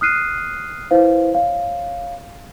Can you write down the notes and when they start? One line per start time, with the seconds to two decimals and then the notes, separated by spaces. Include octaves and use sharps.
0.01 D#6 F6 F#6 C7 D#7
0.91 E4 B4 C5 F5
1.34 C#5 F5